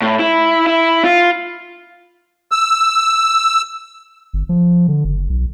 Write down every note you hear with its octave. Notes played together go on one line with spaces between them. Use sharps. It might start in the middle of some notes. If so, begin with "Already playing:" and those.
A2
E4
E4
F4
E6
G1
F3
D3
F#1
B1